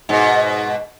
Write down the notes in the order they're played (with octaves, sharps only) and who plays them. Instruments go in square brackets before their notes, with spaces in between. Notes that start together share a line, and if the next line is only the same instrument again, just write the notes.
[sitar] G#2 B2